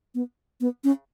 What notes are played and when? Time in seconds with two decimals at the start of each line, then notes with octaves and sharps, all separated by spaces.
0.15 B3
0.60 B3
0.84 C#4